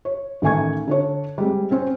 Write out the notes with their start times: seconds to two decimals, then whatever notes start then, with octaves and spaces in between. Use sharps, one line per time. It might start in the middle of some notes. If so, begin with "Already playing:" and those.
0.05 C#5
0.42 A1 D#3 A3 G#5 C#6 G#6
0.88 D3 D4 C#5
1.38 G3 G#3 C4
1.71 C4 C#4 C5